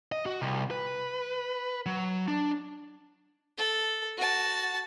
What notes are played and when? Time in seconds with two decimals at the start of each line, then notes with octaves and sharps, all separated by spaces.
0.12 D#5
0.26 F#4
0.42 C2
0.71 B4
1.86 F#3
2.28 D4
3.58 A4
4.17 F#4 A5